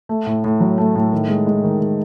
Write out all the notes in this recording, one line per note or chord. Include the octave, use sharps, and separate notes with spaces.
A3
A2
A2
F#3
A3
A2
D#3
G#3
G#3
D#3
G#3